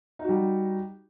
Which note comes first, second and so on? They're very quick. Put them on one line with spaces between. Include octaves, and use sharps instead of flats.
D#4 F#4 G3